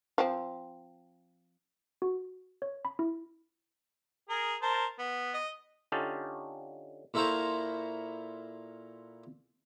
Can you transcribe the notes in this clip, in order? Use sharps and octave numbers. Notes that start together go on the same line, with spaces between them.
F3 C4
F#4
C#5
B5
E4
G#4 A#4
A#4 C5 A5
B3
D#5
D3 C#4 D#4 F4 G4 A4
A#2 E4 A4 A#4 C5 C#6